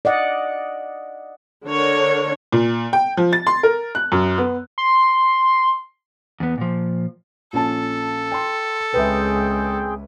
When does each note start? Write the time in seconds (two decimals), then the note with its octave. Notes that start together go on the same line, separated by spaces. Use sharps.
0.05 D5 D#5 F#5
1.64 D3 D4 A#4 C#5
2.52 A#2
2.93 G5
3.17 F3
3.33 A6
3.47 C6
3.63 A#4
3.95 F#6
4.12 F#2
4.38 B3
4.78 C6
6.40 E2 B3
6.58 A#2 F3
7.53 A#1 C#4 A4 A5
8.32 G5 C6
8.94 C#2 C4 G#4 B4 E5 G5